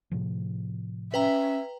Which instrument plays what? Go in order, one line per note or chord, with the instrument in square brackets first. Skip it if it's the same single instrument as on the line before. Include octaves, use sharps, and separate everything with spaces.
[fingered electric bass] A2 C3 F3
[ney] C#4 [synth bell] B4 G5 A#5 [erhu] E5